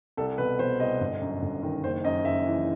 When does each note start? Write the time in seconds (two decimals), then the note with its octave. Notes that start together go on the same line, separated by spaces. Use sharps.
0.17 C2 A4
0.38 B2 B4
0.59 B2 C5
0.80 C2 D#5
1.00 G1
1.21 F#2
1.42 G1
1.63 D#3
1.84 F#1 C5
2.04 F#2 D#5
2.25 F#1 E5
2.46 E3